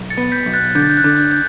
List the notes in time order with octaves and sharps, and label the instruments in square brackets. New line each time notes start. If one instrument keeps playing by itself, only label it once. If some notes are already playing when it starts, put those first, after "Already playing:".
Already playing: [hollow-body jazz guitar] B1
[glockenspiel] A6 C#7
[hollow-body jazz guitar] B3
[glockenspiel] G6 B6
[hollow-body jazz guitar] B1
[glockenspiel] F#6 A6
[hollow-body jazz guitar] D3 [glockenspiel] G6
[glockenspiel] A6
G6
F#6
[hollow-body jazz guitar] D3
[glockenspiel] G6
G6